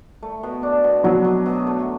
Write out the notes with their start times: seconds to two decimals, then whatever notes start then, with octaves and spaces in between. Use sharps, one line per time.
0.23 A3
0.43 B2
0.63 D4
0.84 B2
1.04 B2 F#3
1.25 B2
1.46 B2
1.67 A3